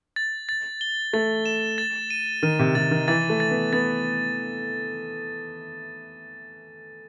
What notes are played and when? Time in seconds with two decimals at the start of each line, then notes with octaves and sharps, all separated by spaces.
0.16 A6
0.49 A6
0.81 G7
1.13 A3 A6
1.46 E7
1.78 A6
2.10 D#7
2.43 D#3 D#7
2.59 C3
2.75 C3 A6
2.91 D#3
3.08 E3 A6
3.30 A3
3.40 A6
3.51 B3
3.73 B3 A6